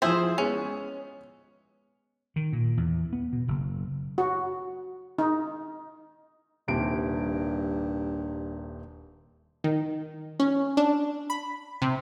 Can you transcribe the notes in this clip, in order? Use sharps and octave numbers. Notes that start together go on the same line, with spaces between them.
F3 E4 G#4 C5 E5
G#3 B3 C#4
D#3
A#2
E2
B3
B2
F#1
F#4
D#4
D#1 G2 C3 D7
D#3
C#4
D4
B5
C3